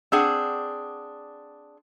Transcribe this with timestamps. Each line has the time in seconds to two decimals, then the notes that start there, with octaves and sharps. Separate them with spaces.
0.12 C4 D4 G#4 F#5